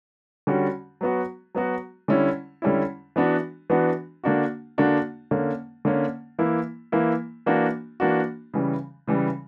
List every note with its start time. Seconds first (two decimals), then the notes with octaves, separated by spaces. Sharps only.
0.47 D3 G3 C#4 F#4
1.01 F#3 B3 F#4
1.55 F#3 B3 F#4
2.08 D3 G3 C#4 E4
2.62 D3 G3 C#4 E4
3.16 E3 B3 D4 F#4
3.70 E3 B3 D4 F#4
4.24 D3 A#3 D4 F#4
4.78 D3 A#3 D4 F#4
5.31 D3 A#3 C#4
5.85 D3 A#3 C#4
6.39 E3 A#3 E4
6.92 E3 A#3 E4
7.46 E3 A#3 D4 F#4
8.00 E3 A#3 D4 F#4
8.54 C#3 E3 G3
9.07 C#3 E3 G3